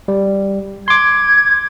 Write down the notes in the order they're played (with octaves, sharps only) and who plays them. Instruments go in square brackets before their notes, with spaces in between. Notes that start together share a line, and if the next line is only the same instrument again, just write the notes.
[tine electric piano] G3
[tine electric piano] C6 D6 [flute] G#6